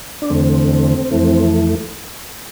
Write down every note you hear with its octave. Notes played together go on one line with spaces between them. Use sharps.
D4
E2 D3 A3 C4
F2 E3 A3